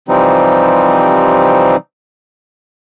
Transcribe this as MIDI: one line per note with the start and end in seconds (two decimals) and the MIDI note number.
0.08 1.76 48
0.08 1.76 52
0.08 1.76 53
0.08 1.76 55
0.08 1.76 60
0.08 1.76 63